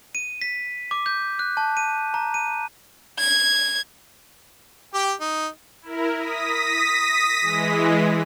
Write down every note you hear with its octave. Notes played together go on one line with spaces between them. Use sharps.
D#7
B6
D6
G6
F#6
A5
D#7
A#5
D#7
G#6
G4 G5
D#4
E4 A#4
D#6 A#6 B6
E3 G#3